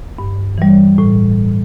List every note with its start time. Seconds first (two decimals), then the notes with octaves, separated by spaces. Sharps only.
0.19 G2
0.58 E3 G3
0.98 A2